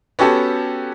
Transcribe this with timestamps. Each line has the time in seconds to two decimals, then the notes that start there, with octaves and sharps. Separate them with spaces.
0.19 B3 C#4 F#4 G4 A4